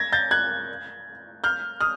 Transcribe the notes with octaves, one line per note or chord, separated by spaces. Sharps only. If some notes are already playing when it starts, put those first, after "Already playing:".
Already playing: G#6 A#6
G6 A6
F#6 G#6
F6 G6
D#6 F6